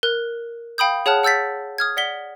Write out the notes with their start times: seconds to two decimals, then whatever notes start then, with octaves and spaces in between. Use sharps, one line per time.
0.03 A#4 F#6
0.78 F5 G5 B5 D#6 G6
1.06 G#4 C#5 F#5 A5 F6 F#6
1.23 F#5 E6 G6 A6 B6
1.78 D#6 F6 G#6
1.97 D5 F#5 B6 G7